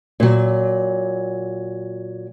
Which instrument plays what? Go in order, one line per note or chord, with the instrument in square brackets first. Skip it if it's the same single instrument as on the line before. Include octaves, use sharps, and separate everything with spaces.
[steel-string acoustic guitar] A#2 F#3